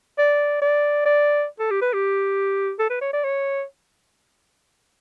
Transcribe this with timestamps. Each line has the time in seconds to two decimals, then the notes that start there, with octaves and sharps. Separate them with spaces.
0.18 D5
0.62 D5
1.05 D5
1.60 A4
1.71 G4
1.82 B4
1.93 G4
2.79 A4
2.90 B4
3.01 C#5
3.13 D5
3.24 C#5